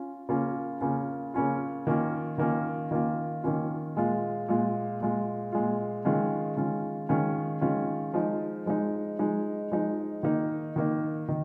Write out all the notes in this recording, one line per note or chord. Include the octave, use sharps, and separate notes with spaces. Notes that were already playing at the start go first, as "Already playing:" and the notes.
Already playing: C#4 F4
C#3 A#3 C#4 F4
C#3 A#3 C#4 F4
C#3 A#3 C#4 F4
D#3 A#3 C#4 F4
D#3 A#3 C#4 F4
D#3 A#3 C#4 F4
D#3 A#3 C#4 F4
A#2 G#3 F4
A#2 G#3 F4
A#2 G#3 F4
A#2 G#3 F4
D#3 G#3 C#4 F4
D#3 G#3 C#4 F4
D#3 G#3 C#4 F4
D#3 G#3 C#4 F4
F3 G#3 D#4
F3 G#3 D#4
F3 G#3 D#4
F3 G#3 D#4
D#3 A#3 D#4
D#3 A#3 D#4
D#3